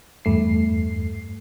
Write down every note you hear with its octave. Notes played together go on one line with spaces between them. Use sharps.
E2 G2 A3 C7